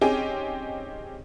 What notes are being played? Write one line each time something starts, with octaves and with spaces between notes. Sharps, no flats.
C4 C#4 D#4 G4 G#4 G#5